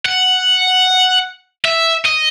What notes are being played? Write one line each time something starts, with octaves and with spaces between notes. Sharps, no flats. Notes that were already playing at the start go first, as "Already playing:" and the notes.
F#5
E5
D#5